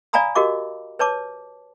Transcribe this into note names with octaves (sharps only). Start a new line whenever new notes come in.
D5 F5 G#5 A#5 B5 D#6
F#4 G4 A#4 D#5 F5 D6
B4 C#5 A5 D6